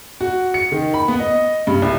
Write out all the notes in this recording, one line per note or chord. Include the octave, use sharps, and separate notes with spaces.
F#4
C#7
D#3
B5
B3
D#5
G2
C2